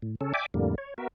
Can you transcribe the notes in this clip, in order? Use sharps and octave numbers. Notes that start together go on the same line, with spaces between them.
A2
C#3 C#4 A4
D5 E5 G5 G#5 D6
F2 A2 D3 G3 A#3
C#5
B3 F#4 A#4 E5